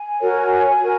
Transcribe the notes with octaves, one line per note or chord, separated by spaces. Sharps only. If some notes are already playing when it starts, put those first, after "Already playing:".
Already playing: G#5
F#4 A#4 C#5
F#4 A#4